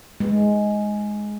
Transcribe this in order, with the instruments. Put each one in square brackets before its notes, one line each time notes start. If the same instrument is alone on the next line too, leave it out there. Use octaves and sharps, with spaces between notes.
[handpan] G#3